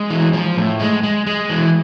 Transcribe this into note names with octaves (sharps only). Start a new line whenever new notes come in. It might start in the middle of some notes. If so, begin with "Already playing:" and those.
Already playing: G#3
E3
F3
A2
G#3
G#3
G#3
E3